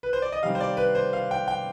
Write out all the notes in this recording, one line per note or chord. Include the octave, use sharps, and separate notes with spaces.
B4
C5
D5
D#5
C3 D#3 G3 C4 F5
C5
D5
B4
C5
F5
G5
G5